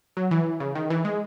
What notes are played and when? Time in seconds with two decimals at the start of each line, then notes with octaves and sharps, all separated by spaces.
0.17 F#3
0.31 E3
0.60 C#3
0.75 D#3
0.90 E3
1.05 G#3